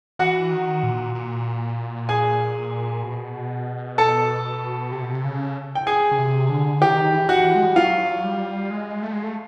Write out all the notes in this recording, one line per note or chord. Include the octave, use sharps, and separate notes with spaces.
E3 F#4 F#5
D#3
A#2
A#2
G#4 G#5
B2
A4 A5
C3
B2
C3
C#3
G5
G#4 G#5
C#3
C3
D3
D#3 G4 G5
E3
F#4 F#5
E3
G#3
G3
F#3 F4 F5
G3
G#3
A3
G#3
A3